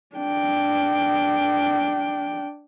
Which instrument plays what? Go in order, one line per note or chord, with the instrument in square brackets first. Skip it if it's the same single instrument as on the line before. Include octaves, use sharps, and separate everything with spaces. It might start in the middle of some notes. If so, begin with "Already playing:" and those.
[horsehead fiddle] D4 G5